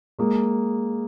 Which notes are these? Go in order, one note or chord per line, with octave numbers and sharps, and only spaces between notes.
G#3 A#3